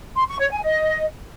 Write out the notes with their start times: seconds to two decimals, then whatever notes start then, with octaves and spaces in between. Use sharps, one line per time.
0.16 C6
0.27 C#6
0.39 C#5
0.51 G#5
0.62 D#5